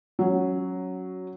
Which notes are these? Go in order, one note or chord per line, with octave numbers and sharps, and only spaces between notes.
F#3 C#4